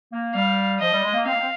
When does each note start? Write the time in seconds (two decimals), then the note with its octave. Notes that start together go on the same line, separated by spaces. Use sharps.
0.13 A#3
0.35 G3 F5
0.80 F3 D#5
0.92 G3
1.03 G#3
1.14 A#3
1.26 C4 F5
1.32 A#3
1.39 C4